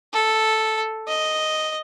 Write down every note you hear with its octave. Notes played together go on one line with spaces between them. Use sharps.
A4
D#5